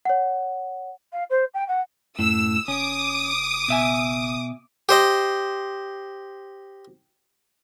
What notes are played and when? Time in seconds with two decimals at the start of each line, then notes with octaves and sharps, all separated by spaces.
0.05 C#5 F#5
1.13 F5
1.30 C5
1.54 G5
1.68 F#5
2.19 F#2 A2 E6
2.68 F#1 C#4 D6 D#6
3.68 B2 E5 G#5
4.89 G4 C5 D#5